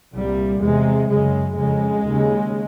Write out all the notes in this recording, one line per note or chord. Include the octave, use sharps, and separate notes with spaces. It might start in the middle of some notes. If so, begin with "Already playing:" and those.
C2 A#2 G3
E2 C3 G#3
F#2 C#3 G#3
F2 C#3 G#3
D#2 C#3